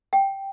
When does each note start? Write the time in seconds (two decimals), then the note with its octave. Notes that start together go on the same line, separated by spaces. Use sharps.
0.13 G5